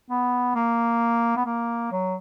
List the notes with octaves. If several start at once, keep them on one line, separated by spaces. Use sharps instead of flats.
B3
A#3
B3
A#3
F#3